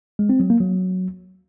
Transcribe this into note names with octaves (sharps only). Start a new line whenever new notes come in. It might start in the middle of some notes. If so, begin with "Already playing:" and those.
G#3
C4
F#3
A#3
F#3